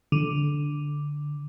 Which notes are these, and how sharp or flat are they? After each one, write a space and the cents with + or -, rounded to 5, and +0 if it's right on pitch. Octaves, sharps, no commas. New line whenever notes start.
D3 -5